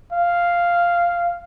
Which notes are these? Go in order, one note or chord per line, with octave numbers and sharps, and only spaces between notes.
F5